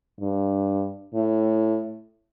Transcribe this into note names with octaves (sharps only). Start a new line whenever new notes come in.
G2
A2